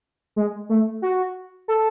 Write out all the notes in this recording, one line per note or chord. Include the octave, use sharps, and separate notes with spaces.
G#3
A3
F#4
A4